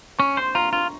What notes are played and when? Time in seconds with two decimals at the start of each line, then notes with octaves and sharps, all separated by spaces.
0.19 C#4 C#6
0.37 C5 C6
0.55 F4 A#5
0.73 F4